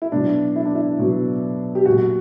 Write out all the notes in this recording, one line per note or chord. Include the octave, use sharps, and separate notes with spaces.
E4
B2 F#3 D4
E4
D4
E4
B2 F#3
G4
A#2 F#3 F#4
F#4